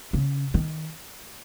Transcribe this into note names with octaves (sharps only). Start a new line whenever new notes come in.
C#3
D#3